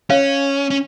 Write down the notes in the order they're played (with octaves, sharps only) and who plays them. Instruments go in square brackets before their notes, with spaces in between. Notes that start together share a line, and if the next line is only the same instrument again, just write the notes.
[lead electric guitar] C#4 [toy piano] C#5 F5
[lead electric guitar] C#4